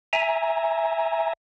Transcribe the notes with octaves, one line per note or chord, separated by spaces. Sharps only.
E5 G#5 A#5